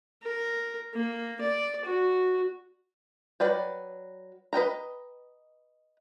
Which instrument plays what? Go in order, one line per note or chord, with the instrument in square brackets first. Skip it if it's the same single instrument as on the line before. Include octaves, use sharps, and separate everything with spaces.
[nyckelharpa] A#4
A#3
D5
F#4
[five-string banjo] F#3 B4 D5 G5
B4 D#5 G5 A#5